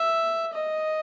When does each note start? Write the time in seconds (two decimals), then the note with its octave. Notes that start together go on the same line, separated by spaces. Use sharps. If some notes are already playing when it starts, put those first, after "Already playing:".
Already playing: E5
0.53 D#5